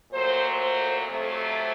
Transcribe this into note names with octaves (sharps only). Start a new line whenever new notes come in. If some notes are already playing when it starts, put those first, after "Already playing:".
A#2 F#3 A3 C5
C5
F2 C3 F#3 A3